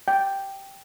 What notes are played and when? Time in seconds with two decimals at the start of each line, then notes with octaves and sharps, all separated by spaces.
0.08 G5